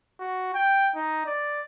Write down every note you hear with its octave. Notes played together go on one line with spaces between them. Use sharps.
F#4
G5
D#4
D5